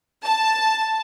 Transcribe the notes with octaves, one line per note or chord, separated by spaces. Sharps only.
A5